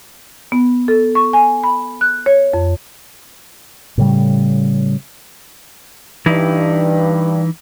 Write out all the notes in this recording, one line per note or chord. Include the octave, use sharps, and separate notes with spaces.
B3
A4
C#6
G#5
B5
F#6
C#5
F2
A2 C#3 G3
G2 E3 D#4 E4